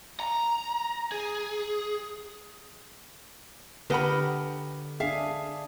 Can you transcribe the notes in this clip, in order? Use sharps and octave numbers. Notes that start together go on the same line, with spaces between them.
A#5
G#4
D3 G4 A#4 B4 D#5 F#5 B5
D4 G#4 E5 F5